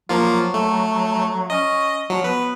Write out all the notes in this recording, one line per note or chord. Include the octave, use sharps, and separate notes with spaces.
F3 F#3 A#3 F4
A3
C#4 D#5
F3 F#3
B3 B4